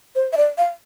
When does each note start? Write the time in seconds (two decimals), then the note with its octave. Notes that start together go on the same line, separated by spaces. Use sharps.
0.15 C5
0.33 E5
0.37 D5
0.58 F5